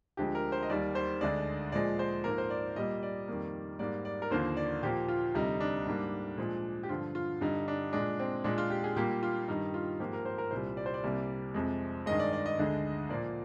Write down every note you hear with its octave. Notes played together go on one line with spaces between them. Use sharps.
D2 D3 F3 G#3 G4
A#4
C5
D#5
D#2 D#3 G3 D5
C5
D2 D3 G#3 D5
A#2 F3 G#3 D5
C5
G#2 F3 A#3 A#4
C5
D5
A#2 G3 A#3 D#5
D5
F2 D#3 G3 A#3
G#2 G3 A#3 D5
D5
A#4
D#2 D3 F3 A#3 C5
D5
A#2 F3 A#3 G4
F4
D2 C3 G3 D#4
D4
G#2 G3 A#3
A#2 F3 G#3
G4
G2 D3 F3 F4
F4
G2 D3 G3 D#4
D4
A#2 G#3 D4
C4
A#2 G#3 D4
F4
G4
G#4
A#2 G3 A#3 G4
F4
G2 D#3 G3 D#4
F4
G#2 F3 A#3 G4
A#4
C5
A#4
C2 A#2 G3 C5
D5
C5
D5
C2 C3 G3 A#3
F2 C3 F3 G#3
G2 D#3 G#3 D#5
D5
D5
D#5
D2 D3 G#3
A#2 F3 A#3 D5